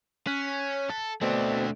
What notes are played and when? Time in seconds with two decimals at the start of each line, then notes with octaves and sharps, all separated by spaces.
0.27 C#4 F#6 B6
0.89 A4
1.21 B2 A3 C4 D4